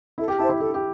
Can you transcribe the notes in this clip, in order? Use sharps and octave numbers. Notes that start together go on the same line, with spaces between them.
E4 A4
G4
E4 C5 A5
E4
E4 A4
G4